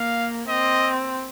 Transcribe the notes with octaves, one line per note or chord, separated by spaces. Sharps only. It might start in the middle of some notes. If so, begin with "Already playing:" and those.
Already playing: A#3 F5
C4 D#5